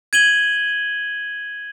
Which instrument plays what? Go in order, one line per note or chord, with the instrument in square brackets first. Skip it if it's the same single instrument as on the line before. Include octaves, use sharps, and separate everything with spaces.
[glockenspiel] G#6 D#7 F#7 G7